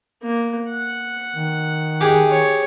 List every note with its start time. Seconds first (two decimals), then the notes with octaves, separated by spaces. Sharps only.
0.22 A#3
0.70 F#5
1.36 D#3
2.01 G4 G#4 G#5
2.30 C#5